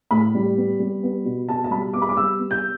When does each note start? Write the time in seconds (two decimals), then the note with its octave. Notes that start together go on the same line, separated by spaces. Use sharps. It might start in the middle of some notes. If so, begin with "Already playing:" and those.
0.11 A2 B5
0.35 G3
0.57 B3
0.80 G3
1.03 B3
1.25 B2
1.49 B2 A5
1.64 A5
1.71 G3 B5
1.93 B3 D6
2.02 B5
2.09 D6
2.17 G3 E6
2.39 B3
2.51 G6